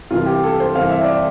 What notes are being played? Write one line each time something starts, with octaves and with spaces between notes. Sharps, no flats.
C2 C3 E3 F4
G4
A4
C5
C2 C3 E3 F5
E5
D5